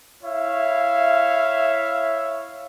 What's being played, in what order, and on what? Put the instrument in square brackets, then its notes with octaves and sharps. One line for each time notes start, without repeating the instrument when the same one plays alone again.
[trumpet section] E4 C#5 E5 F5